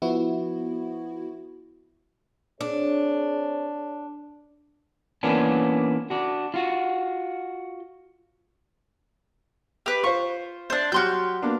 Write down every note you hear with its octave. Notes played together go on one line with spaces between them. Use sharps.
F3 B3 E4 F#4
C4 D4 G#4 C#5
E3 A#3 B3 C#4 D4
D4 F#4
F4 F#4
G4 B4
F4 C5 C#6
D4 C5
F#3 F#4 G4 C6 F6 G6
A#3 B3 D4